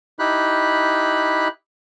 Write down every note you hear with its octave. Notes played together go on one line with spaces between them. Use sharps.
D#4 E4 G4 B5 F#6